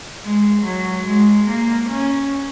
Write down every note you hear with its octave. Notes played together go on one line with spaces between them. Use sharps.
G#3
F#3
G#3
A#3
C#4